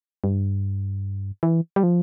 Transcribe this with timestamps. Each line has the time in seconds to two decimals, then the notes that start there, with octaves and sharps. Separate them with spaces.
0.24 G2
1.43 E3
1.76 G3
1.83 F3